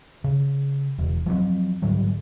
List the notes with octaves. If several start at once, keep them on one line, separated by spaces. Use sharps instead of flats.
C#3
E1
F3 F#3 A3 C4
G#2 D3 F#3 G3